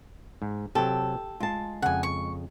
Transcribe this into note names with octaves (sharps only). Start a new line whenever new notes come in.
G#2
C3 F#3 G4 A4
G#3 F4 A5
F2 C#3 F#5 G#5
C#6